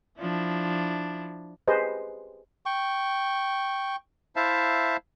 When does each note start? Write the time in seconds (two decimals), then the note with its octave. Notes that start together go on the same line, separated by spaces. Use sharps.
0.19 F3 D4 E4
1.68 G4 G#4 B4 C5 D#5
2.66 G5 C#6
4.36 E4 C5 E5 F5 A5